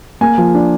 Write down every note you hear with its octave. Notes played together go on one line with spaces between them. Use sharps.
A#3 G#5
F3
D4